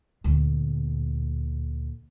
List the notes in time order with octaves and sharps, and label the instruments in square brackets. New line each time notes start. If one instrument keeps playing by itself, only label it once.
[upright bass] D2 A#2